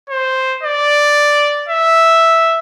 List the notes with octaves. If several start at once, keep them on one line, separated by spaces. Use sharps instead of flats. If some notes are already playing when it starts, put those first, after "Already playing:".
C5
D5
E5